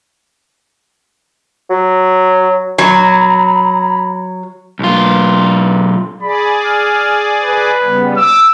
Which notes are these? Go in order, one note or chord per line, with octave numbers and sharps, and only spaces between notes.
F#3
F#3 A#5 B5
B1 F4
G#4 D5 B5
F6
B4
C#3 G3 B3
D6 E6